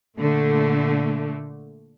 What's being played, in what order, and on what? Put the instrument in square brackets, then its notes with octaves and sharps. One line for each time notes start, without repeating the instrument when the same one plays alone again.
[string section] A#2 D3 A3